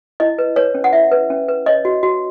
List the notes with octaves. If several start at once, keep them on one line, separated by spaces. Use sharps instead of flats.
E4 D#5
B4
B4 C#5
C#4
F#5
E4 E5
B4
C#4
B4
C#5 D#5
F#4
F#4